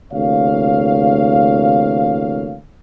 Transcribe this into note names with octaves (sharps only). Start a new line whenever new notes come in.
D2 C3 E3 A#3 C#5 F5